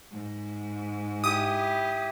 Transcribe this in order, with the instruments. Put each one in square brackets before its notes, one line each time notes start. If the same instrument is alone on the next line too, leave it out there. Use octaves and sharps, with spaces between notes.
[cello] G#2
[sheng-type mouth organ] E4 G4 [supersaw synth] D#6